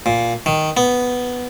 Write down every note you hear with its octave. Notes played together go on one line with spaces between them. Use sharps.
A#2
D#3
B3